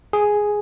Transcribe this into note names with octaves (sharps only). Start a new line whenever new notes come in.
G#4